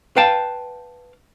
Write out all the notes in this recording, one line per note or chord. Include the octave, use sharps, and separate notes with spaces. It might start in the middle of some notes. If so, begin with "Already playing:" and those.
B4 F5 G5 A5